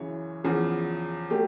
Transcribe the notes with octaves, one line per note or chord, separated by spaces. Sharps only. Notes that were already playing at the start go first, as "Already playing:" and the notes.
Already playing: F#2 C#3 E3 C#5
E2 C#3 F3
F#3 A3 G4